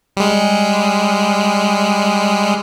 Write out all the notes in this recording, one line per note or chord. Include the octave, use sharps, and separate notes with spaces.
G3 G#3